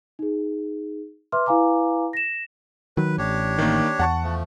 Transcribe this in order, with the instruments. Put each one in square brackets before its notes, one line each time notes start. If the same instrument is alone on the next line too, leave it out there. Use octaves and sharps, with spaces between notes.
[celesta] D#4 G#4
B4 E5 C6 D6 F6
E4 B4 F5 G#5 A#5 D6
A#6 E7
[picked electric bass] D#3 F#3 [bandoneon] B4
[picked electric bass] A1 [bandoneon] D4 G4 C#5
[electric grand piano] D#3 A#3
[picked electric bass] E2 [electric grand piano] F#5 A5 C#6
[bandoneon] F3 A3